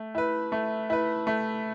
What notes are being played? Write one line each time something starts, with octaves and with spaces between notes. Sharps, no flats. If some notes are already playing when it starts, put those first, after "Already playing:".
Already playing: A3
E4 B4
A3
E4 B4
A3